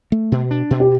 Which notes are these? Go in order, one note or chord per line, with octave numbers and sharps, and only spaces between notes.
A3
B2
D4
B2
G4